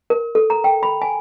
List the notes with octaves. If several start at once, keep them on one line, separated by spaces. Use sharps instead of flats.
A#4
A4
A#5
G5
B5
G#5